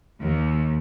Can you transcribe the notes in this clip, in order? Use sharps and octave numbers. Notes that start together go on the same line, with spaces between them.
D#2